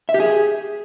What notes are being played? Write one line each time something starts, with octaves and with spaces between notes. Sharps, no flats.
E5
G4
G#4